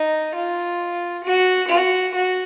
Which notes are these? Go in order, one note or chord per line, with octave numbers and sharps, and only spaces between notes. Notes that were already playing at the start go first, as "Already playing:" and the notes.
Already playing: D#4
F4
F#4
F#4
F#4